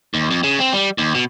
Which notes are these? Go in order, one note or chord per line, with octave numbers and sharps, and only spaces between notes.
D#2
F2
C#3
C4
G3
D#2
B2